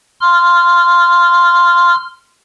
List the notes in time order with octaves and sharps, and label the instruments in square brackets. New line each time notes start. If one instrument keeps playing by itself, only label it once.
[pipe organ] C6 F6